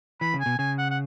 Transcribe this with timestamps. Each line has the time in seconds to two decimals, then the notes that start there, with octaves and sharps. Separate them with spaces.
0.21 E3 B5
0.34 C#3
0.40 G#5
0.46 B2
0.59 C#3 G#5
0.78 F#5
0.90 F#5